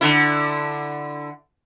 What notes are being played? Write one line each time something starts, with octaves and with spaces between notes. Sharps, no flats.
D3 E4